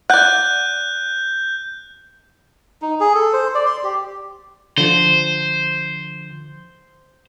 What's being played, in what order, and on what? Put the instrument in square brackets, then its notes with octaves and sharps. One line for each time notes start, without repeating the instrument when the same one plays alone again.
[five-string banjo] D5 F#5 [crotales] F#6 G6
[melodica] D#4
G#4
A4
C5
D5
C6
G4
[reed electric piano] D3 F3 [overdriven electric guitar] C5